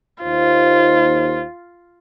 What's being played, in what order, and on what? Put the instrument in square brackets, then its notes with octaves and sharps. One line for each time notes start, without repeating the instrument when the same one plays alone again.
[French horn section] D#2 D#4 C5 [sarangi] F4